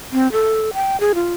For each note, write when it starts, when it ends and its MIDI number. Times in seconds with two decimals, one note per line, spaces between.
0.12 0.31 60
0.32 0.70 69
0.74 0.99 79
1.00 1.12 68
1.15 1.35 65